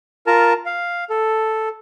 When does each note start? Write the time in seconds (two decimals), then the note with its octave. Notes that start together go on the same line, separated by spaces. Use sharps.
0.27 F4 A#4 A5 A#5
0.66 F5
1.10 A4